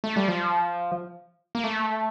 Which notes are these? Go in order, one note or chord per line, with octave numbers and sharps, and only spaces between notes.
A3
G3
F3
A#3
A3